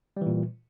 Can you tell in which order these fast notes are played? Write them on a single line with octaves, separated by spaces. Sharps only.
G3 E3 A#2